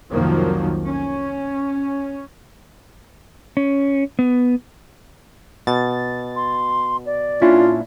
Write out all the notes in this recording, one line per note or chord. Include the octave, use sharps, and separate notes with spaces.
C2 F2 D#3 F3 F#3 A#3
C#4
C#4
B3
B2 A6
C6
D5
A#2 C#4 D4 E4 F4